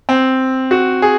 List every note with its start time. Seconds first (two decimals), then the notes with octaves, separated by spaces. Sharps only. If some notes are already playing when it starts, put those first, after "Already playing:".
0.09 C4
0.71 F#4
1.02 G#4